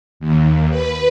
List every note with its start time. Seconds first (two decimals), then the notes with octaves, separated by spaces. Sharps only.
0.20 D#2
0.70 B4